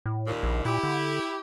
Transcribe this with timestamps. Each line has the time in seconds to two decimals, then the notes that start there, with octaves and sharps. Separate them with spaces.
0.06 A2
0.27 D#2 A#2
0.43 A#1
0.65 A#2 E4 G4
0.83 D3